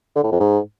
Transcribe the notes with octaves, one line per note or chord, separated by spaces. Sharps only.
D3
A2
F2
G#2